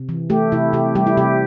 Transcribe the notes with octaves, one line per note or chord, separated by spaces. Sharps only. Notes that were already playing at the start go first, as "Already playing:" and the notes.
Already playing: C3
E3
A3 G4
C3 E4
C3 G4
G3 G4
E4
C3 G4